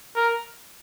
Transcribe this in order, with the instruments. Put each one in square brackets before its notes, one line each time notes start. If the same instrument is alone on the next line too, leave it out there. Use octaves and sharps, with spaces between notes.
[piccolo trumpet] A#4